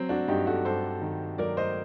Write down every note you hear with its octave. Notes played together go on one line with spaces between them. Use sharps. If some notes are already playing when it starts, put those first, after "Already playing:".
Already playing: F#3 C4
D4 F#4
G2 D#4 G4
F#4 A4
G2 A4 C5
D#3
F#3 A#4 D5
C5 D#5